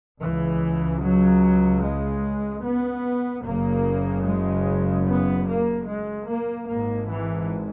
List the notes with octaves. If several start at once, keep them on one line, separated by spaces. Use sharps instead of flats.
C#2 C#3 E3
F#3
G#3
B3
F#1 F#2 C#3 A#3
G#3
B3
A#3
G#3
A#3
G#1 G#2 A#3
E3